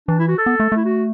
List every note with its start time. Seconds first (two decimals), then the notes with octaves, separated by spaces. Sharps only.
0.08 E3 D4
0.19 E4
0.28 F#4
0.38 A4
0.46 B3
0.60 A3
0.72 A3 E4
0.85 F#4